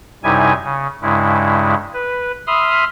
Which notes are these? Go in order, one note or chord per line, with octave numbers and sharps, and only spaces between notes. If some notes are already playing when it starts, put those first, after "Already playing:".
F#2 C3 G3 D#4 E4 G#5
C#3
G2 C#3 G#3 E4
B4
E5 B5 C6 D#6 F6